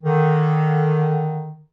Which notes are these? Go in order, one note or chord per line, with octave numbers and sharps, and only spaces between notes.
D3 D#3